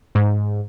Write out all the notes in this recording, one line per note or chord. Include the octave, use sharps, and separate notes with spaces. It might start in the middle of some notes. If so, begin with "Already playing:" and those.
G#2